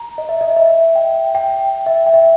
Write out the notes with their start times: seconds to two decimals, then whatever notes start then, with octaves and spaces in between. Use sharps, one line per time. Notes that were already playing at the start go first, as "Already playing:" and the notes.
Already playing: A#5
0.18 D#5
0.29 E5
0.41 D#5
0.56 E5
0.95 G5
1.35 G5
1.86 E5
2.06 G5
2.14 E5